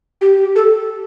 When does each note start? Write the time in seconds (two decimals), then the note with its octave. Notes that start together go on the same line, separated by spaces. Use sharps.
0.21 G4
0.56 A4